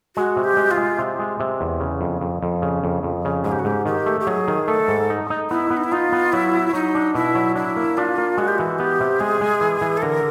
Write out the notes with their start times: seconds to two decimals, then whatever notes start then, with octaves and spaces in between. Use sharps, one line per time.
0.16 G#3 F#4
0.36 C3
0.44 G4
0.57 G#3
0.71 F4
0.77 G#3
0.98 C3
1.19 G#3
1.40 C3
1.61 E2
1.80 C#3
2.01 F2
2.21 F2
2.42 F2
2.62 C#3
2.84 F2
3.03 F2
3.25 C#3
3.44 G#2 G#4
3.52 G4
3.59 F#4
3.65 G#2 G4
3.86 D#3 G4
4.06 A3
4.20 G4
4.27 F#3 G#4
4.48 D#3
4.68 A3 A4
4.88 G#2
5.10 D#4
5.30 D#4
5.50 B3 E4
5.70 B3
5.77 D#4
5.84 E4
5.92 D#4 F4
6.12 B3
6.33 F#3 E4
6.54 F#4
6.73 F#3 D#4
6.95 D4
7.15 B2 E4
7.35 F#3
7.55 D4 E4
7.76 A#3
7.97 D4 F4
8.18 A#3
8.38 G#3 F#4
8.48 G4
8.58 E3 F#4
8.79 B3 G4
9.00 C3
9.20 G#3 G#4
9.41 G#3
9.61 E3
9.81 E3
9.97 A4
10.02 D3 A#4